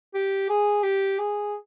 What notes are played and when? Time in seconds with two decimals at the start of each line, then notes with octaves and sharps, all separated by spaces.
0.14 G4
0.49 G#4
0.83 G4
1.19 G#4